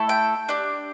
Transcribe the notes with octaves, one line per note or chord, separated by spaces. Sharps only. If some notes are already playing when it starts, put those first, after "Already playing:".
Already playing: A3 E4 A4
G5
D4 G4